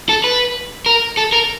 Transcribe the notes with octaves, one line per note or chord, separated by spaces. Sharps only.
A4
B4
A#4
A4
A#4